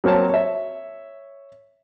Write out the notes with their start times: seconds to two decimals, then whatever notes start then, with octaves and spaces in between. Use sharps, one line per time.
0.04 F#3 A#3 C4 C#5 A5
0.29 C#5 E5